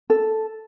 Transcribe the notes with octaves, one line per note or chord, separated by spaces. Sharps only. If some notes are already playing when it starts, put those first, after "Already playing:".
A4